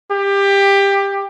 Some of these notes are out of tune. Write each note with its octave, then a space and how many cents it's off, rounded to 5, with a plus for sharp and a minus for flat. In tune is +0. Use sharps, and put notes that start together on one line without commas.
G4 +20